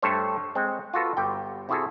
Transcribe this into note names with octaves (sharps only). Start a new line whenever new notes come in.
G2 A3 A4 C5 C#5
G#3 C4
F4 F#4 A4 B4
G1 G4 G5
C3 E4 F#4 G#4 A4